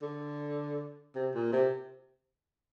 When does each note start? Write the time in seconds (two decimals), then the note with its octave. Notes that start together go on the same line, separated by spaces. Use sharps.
0.02 D3
1.15 C3
1.35 A#2
1.53 C3